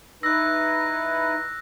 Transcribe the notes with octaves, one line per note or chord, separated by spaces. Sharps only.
D#4 E4 B4 E6 F#6 A#6